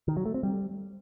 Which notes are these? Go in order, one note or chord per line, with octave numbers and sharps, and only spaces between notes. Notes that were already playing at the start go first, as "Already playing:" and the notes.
D#3
F#3
A3
C4
G3